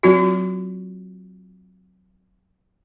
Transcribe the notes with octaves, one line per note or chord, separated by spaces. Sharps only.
F#3 C4 F4 F#4